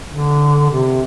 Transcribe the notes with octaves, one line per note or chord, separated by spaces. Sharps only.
D3
C3